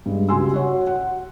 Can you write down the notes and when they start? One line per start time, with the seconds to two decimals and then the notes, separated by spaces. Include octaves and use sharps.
0.06 G2 G#3
0.29 C#2 F#4 G4 G#5 C6 E6
0.54 F#4 C#5 F#5
0.87 F#5